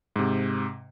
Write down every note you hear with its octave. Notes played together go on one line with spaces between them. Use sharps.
G#2 C3